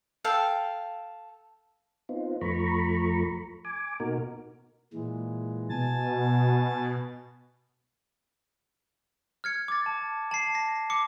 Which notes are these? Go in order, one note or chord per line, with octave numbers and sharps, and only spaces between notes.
A4 F5 G5
B3 C4 D#4 F4
F2 F3 A3 A#5 B5 C#6
G#5 D6
B2 A#3 D#4 F#4 A#4
A#2 E3 G#3
B2 G#5 A5 A6
F6 G#6 C#7
D6 A6
A5
A5 C7
A#6
D6 C#7